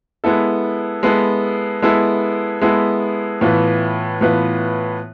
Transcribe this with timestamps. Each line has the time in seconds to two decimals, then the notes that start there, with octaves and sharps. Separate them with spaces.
0.24 G#3 B3 E4 A4
1.03 G#3 B3 E4 A4
1.82 G#3 B3 E4 A4
2.61 G#3 B3 E4 A4
3.41 A2 E3 B3 F4 B4
4.21 A2 E3 B3 F4 B4